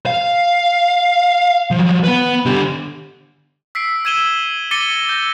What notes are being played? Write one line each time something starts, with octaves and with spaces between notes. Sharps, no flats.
F5
F3 F#3
B3 B4
D3 G4
E6 B6 C7 D7
E6 G#6 D#7 E7 F#7 G7
D6 A6 A#6 C#7 D#7 G7
E6 G6 A#6